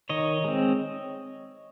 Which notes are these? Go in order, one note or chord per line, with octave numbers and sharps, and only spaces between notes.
D#3 C#5 D#5
G#3 C4